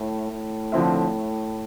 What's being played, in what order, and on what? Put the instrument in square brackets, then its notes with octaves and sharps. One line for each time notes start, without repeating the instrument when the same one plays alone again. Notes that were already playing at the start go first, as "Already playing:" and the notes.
Already playing: [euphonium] A2
A2
[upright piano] D3 F3 C4 E4